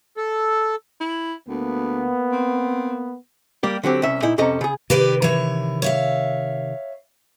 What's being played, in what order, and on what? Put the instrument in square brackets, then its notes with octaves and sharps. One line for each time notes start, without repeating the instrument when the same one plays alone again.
[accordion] A4
[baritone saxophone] E4
[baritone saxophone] D2 [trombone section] A#3 B3
[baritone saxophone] C4
[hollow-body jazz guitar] G3 A#3 G4
D3 F#3 C4 G4
C2 C#4 E5
A#2 D#4 E4
F2 C3 C#4 A4 D#5 A#5
C#3 G#4
[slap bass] C3 D#3 [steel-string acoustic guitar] G4 B4 D5
[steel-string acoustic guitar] E3 C#5
C#5 E5 F5